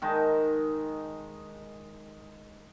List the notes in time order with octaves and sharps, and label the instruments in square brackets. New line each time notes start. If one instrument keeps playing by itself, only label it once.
[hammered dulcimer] D#3 G#3 D#4 A5